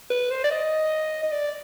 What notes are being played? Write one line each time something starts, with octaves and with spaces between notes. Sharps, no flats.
B4
C5
D5
D#5
D#5
D5